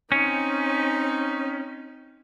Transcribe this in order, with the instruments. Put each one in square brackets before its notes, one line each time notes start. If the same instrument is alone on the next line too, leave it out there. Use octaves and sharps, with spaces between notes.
[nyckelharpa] C4 D#4 [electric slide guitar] C#4